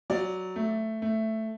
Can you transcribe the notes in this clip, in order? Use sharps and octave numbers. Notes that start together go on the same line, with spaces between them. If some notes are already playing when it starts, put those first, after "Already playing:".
F#3 D5
A3
A3